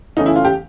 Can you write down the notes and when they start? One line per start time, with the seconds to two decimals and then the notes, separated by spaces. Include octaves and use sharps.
0.17 E2 C#3 E3 A3 C#4 D#4
0.26 E4
0.36 F4
0.45 G4